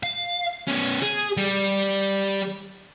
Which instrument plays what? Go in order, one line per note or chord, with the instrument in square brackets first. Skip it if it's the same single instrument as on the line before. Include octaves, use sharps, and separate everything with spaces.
[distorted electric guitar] F5
B3 C#4
G#4
G3